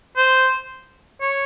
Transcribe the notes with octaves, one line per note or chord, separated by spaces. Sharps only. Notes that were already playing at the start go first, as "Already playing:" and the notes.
C5
C#5